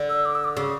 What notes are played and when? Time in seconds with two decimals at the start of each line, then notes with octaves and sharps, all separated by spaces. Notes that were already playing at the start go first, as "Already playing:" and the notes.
Already playing: D3
0.09 E6
0.25 D6
0.35 E6
0.44 D6
0.57 C#3